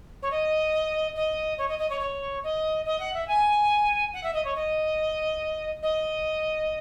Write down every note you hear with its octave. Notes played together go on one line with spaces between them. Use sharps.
C#5
D#5
D#5
C#5
D#5
D#5
C#5
C#5
D#5
D#5
F#5
E5
G#5
F#5
E5
D#5
C#5
D#5
D#5